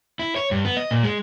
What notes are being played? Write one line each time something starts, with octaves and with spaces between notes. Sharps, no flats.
E4
C#5
G2
B3
D#5
A#2
G#3